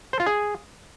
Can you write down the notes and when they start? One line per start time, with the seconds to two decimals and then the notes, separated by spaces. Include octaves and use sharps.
0.13 C5
0.20 F4
0.26 G#4